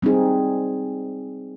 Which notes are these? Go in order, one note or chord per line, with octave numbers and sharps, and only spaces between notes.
G3 C4 D#4 G#4